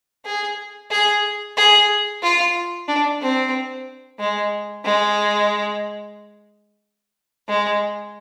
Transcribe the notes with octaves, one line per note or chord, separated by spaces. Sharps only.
G#4
G#4
G#4
F4
D4
C4
G#3
G#3
G#3